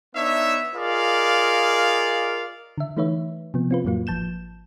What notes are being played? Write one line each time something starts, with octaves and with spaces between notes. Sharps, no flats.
B3 D4 D#4 C#5 E5
F4 G#4 A#4 D5 D#5 F5
D3 E5
E3 A3 D#4 B4 C#5 E5
C3 F3 B3
C4 F4 B4
F2 A2 F#3 A#3 F4
G#1 F3 A5 G6 E7